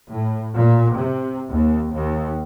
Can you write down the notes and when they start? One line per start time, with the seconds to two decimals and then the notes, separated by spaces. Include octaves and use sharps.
0.11 A2
0.55 A#2
0.98 C3
1.49 D#2
1.93 D#2